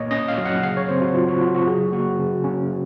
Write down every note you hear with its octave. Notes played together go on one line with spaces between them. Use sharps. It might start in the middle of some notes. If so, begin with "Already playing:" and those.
Already playing: A#2 A#3 C#5 D#5
C#4 D#5
F5
F#3
F#5
C#3 F5
C#5
C4 C5
F#4
F#3 F4
F#4
C#3 F4
F#4
F#3 G#4
A#3 F#4
C#3
C#4